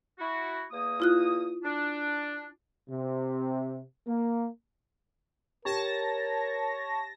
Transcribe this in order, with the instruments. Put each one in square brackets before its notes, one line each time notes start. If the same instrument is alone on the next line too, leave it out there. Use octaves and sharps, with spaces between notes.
[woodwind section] E4 F#4
E2 A#3 D#6
[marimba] E4 F4 F#6
[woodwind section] D4
[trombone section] C3
A#3
[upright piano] G4 [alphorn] A#4 [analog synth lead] C#5 [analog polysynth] A5 A#6